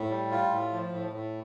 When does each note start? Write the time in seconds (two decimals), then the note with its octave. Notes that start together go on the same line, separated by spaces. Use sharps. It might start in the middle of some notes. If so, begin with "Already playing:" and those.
Already playing: A2
0.10 G3
0.31 F4
0.51 A2
0.72 F3
0.92 A2
1.13 A2